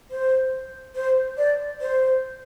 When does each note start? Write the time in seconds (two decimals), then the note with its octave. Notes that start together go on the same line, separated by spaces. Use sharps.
0.11 C5
0.96 C5
1.38 D5
1.81 C5